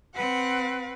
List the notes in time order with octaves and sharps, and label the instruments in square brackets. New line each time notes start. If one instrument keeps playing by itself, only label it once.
[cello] C4 B4 [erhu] F#5